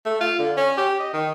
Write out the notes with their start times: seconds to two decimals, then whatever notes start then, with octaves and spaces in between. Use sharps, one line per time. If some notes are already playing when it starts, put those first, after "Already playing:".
0.06 A3
0.21 F4
0.39 D3
0.57 C#4
0.78 G4
1.00 D#5
1.14 D#3